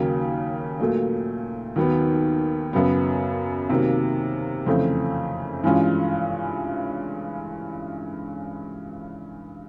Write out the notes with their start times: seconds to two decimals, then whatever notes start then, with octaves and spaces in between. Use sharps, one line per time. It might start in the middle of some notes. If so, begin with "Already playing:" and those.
Already playing: D#2 C#3 F#3 A#3
0.80 A#2 F#3 A3
1.76 D#2 D#3 F#3 B3
2.73 F#2 C#3 F#3 B3
3.70 C3 D#3 F#3 A#3
4.66 F2 C#3 E3 A3 C4
5.64 G2 E3 G#3 C#4 F4